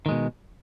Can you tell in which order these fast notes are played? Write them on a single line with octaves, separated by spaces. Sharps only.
D#3 G#3 B2